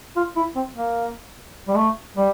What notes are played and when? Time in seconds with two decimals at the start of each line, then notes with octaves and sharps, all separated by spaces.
0.16 F4
0.36 E4
0.56 C4
0.76 A#3
1.68 G3
1.76 A3
2.17 G3